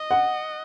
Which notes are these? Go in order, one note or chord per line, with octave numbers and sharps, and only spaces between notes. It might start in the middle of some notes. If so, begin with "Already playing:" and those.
Already playing: D#5
F#5